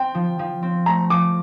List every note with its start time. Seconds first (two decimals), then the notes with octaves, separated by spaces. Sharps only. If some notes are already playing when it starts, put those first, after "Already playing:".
Already playing: C4 G5
0.15 F3
0.39 F3
0.63 C4
0.86 A3 A#5
1.10 F3 D6